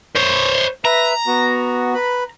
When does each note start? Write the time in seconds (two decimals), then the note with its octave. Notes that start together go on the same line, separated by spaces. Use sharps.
0.15 C5 C#5
0.85 B4 E5 A#5
1.27 B3 F#4
1.94 B4 B5